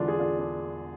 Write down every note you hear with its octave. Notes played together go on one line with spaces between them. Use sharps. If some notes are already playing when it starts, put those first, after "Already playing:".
Already playing: E1 E2 D3 D4 F4
G#4
D4 F4
D4